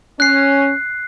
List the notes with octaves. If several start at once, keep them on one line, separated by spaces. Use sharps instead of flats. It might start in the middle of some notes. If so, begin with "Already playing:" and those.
C#4 F#6 C7